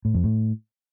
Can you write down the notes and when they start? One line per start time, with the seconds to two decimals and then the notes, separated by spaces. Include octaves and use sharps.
0.05 A2
0.14 F2
0.24 A2